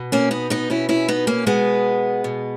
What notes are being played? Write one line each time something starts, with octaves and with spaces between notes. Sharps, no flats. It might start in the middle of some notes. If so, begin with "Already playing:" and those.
Already playing: B2
A#3 C#4
B3 D#4
B3 D#4
B2 C#4 E4
C#4 E4
B3 D#4
A#3 C#4
B2 G#3 B3
B2